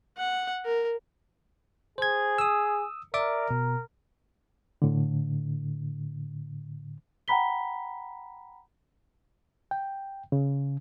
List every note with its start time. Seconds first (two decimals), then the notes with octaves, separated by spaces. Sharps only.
0.18 F#5
0.65 A#4
1.98 G#4 C5 G#6
2.38 D#6 E6
3.14 A#4 D5 E5 D6
3.51 B2
4.82 A2 D3
7.28 F#5 G5 A#5 B5 B6 G7
9.71 G5
10.32 C#3